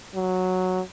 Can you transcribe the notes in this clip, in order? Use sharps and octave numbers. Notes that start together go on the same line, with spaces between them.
F#3